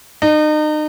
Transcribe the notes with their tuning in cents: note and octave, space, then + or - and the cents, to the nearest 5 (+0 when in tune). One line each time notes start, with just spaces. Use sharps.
D#4 -35